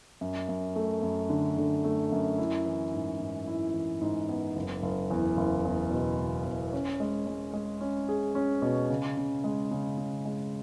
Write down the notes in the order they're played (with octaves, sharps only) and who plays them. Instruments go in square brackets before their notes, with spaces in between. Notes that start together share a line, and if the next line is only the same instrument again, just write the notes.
[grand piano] F#2
F#2
A3
F#2
D3
D3
A3
F#2
E4
E3
G#2
G#2
E4
E3
G#2
B3
F#1
F#1
E2
F#1
E2
B2
B2
E2
C#4
G#3
G#3
G#3
C#4
G#4
C#4
B2
C#3
C#3
G#3
C#3
C#3
G#3